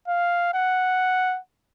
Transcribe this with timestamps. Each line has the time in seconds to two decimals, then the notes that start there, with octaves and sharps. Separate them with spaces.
0.08 F5
0.54 F#5